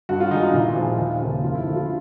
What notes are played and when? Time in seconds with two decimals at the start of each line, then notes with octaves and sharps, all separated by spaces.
0.09 G2 F#4
0.20 F4
0.31 D#3 G#3 D#4
0.43 D#4
0.53 A#2 E4
0.75 F3 G#3
0.98 D#2
1.21 C#3 F3 A#3
1.43 F2 F4
1.55 E4
1.66 D3 F3 A3
1.76 F4